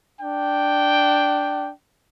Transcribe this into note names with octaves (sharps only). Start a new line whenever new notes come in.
D4 G5